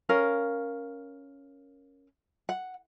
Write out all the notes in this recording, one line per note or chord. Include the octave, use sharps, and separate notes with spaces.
C#4 A#4 F5
F#5